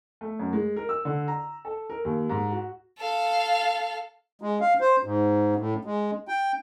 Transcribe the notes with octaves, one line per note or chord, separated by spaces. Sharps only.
A3
F#2
G#3
A#4
E6
D3
A#5
A4
A#4
D#2
G#2
F#4
A4 F5
G#3
F5
C5
G#2
A2
G#3
G5